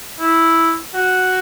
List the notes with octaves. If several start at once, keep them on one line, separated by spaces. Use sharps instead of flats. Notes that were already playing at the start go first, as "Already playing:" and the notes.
E4
F#4